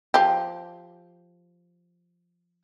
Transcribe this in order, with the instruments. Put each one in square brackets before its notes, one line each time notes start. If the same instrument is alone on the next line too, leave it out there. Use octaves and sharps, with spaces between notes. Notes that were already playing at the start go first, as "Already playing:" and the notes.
[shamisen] F3 G4